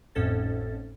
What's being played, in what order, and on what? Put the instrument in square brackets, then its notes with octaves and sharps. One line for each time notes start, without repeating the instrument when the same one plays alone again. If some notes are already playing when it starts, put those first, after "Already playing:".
[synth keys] G#1 F2 A2 C#4 A4 A6